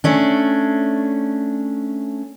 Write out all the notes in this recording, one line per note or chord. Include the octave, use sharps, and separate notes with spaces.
A3 C#4 D4